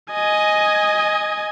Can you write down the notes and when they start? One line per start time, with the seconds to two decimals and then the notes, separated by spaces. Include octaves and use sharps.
0.12 D#5 G#5